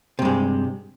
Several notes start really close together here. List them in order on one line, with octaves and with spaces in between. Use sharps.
C3 G2 G#3